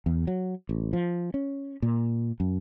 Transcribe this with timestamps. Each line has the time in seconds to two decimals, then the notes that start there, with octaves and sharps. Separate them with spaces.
0.06 E2
0.27 F#3
0.69 A1
0.93 F3
1.34 C#4
1.82 A#2
2.40 F#2